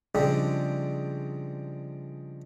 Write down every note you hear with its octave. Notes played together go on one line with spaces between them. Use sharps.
C#3 F3 G3 G#3 C4 D4